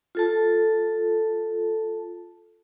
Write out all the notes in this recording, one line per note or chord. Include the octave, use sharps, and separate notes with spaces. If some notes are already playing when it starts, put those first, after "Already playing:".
F4 A4 A5